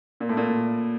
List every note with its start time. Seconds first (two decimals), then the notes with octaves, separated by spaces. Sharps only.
0.20 A#2
0.29 A2
0.37 A#2